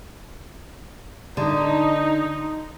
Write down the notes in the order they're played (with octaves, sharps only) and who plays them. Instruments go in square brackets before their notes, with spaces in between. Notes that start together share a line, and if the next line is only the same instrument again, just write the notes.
[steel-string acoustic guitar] D3 [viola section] D#4